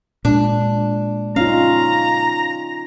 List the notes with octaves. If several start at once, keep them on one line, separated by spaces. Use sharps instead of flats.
A#2 G#3 D4
C#4 D#4 F4 F5 A#5